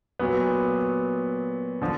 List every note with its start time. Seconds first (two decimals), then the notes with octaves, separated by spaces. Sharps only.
0.19 A#2 F#3 B3
1.81 D3 F3